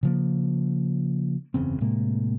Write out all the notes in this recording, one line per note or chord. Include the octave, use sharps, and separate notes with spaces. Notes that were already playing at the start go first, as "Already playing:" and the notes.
C#3 F3 A#3
F#1 E2 C#3 C4
A2 C3 G#3 A#3